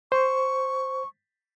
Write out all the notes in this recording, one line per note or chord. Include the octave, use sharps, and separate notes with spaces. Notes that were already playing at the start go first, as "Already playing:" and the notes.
C5 C#6